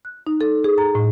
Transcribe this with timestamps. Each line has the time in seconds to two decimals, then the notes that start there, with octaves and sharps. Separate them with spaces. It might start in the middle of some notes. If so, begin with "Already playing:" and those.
0.05 F#6
0.27 D#4
0.41 A4
0.64 G#4
0.78 A#5
0.95 A2